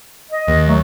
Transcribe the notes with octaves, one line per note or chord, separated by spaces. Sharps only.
D#5
D#2
F#3 A3